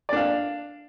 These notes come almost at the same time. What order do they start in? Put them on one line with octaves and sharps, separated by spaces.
D5 D4 F5